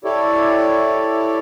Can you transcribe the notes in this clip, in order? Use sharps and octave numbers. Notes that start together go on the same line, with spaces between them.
E4 G4 A4 C#5 D5